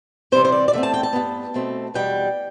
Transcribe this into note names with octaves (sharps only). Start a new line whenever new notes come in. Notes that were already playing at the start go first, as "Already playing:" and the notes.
C3 E3 G3 C4 C5
C5
D5
D5
E2 D3 A3 C4 E5
A5
G5
A5
G2 F3 B3
B2 A3 C4
E2 B2 G3 G5